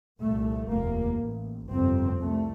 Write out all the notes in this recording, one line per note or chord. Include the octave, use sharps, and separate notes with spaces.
C2 A#2 A3
F1 D#2 A#3
A1 A2
G1 F2 C3 C4
C2 A3